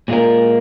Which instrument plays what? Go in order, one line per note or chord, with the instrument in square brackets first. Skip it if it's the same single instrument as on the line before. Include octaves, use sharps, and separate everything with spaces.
[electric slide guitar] A#2 G#3 F4 A#4